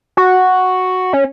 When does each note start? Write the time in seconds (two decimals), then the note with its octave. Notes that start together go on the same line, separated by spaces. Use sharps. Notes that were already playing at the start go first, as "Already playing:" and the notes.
0.17 F#4
1.13 C#4